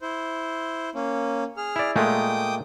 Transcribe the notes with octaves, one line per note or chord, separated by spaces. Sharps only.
E4 C5
A#3 C#4
G#4 F6
E4 D5
A#2 G#3 A3 G5 D6 D#6